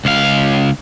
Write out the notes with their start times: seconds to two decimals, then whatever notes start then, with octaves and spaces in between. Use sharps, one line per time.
0.05 C#2 F5